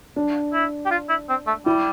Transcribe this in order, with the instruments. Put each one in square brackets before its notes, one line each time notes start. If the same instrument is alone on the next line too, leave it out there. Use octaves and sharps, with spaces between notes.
[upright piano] D4
[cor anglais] E4
G4
F4
E4
C4
A3
[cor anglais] G3 [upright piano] E4